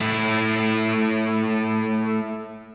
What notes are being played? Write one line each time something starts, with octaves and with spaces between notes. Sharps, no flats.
A3 E4